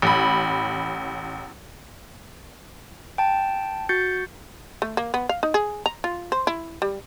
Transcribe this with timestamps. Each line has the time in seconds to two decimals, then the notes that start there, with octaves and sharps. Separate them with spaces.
0.02 A1 B5
3.18 G5 A5
3.89 F#4 G6 A6 C#7
4.82 A3
4.97 A#3
5.14 B3
5.29 F5
5.43 D#4
5.54 G#4
5.86 A#5
6.04 F4
6.32 C5
6.47 E4
6.82 G3